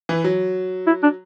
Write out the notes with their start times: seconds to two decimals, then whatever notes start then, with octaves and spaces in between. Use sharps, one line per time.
0.09 E3
0.24 F#3
0.87 E4
1.03 D4